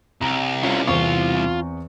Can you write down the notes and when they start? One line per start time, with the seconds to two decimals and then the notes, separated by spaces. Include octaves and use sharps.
0.21 C2 A#5
0.63 C#4 F4
0.87 E2 C4 F4 C#6